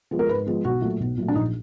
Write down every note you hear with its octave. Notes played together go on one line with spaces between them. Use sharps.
F3 G#3 B3
A#4
G#2 B4
F3 G#3 B3
B1 F#4
A#2 F#3 A3
B1
A#2 F#3 A3
D4
A#1 D#4